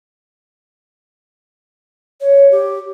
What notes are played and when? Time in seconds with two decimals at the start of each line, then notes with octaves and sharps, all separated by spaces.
2.21 C#5
2.51 G4